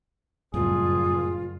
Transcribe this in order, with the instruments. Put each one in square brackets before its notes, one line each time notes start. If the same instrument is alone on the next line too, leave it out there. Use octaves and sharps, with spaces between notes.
[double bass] F#1 [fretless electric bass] F2 A2 G3 [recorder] F4 [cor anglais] G#4